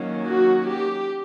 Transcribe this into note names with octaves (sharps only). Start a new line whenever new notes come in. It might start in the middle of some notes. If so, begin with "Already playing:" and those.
Already playing: D#3 F#3 A#3 C#4
F#4
G4